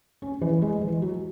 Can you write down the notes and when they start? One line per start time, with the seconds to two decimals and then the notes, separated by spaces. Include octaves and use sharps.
0.22 C#4
0.42 E3
0.62 G#3
0.81 E3
1.02 F#3